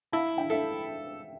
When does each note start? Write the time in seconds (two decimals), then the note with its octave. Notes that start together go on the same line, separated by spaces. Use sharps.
0.13 E4 F5 A5
0.37 E5 G5
0.50 A4 E5